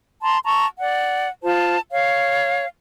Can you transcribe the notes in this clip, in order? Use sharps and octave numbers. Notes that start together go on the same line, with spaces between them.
A5 A#5 C6
A5 A#5 C#6
D5 F#5
F4 C5 A5
C#5 F5